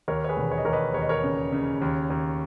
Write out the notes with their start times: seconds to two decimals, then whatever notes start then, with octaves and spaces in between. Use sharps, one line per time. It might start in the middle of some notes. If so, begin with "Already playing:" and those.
0.08 D#2 A#4 C#5
0.24 C#5
0.29 G#4 B4
0.37 E1
0.51 C#5
0.58 D#5
0.65 D#2 A#4 C#5
0.73 B4 D#5
0.94 D#2 C#5
1.02 D#5
1.09 A#4 C#5
1.24 C#3
1.52 C#3
1.82 D#2
2.10 D#2